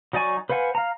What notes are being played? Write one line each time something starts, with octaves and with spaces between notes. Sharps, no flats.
F#3 D#4 D5 G#5 C#6
B4 C5 F5 F#5 G#5
F5 A#5